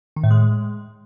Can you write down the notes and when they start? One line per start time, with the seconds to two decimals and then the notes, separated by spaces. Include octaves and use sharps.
0.16 D#3
0.24 A2
0.31 G#3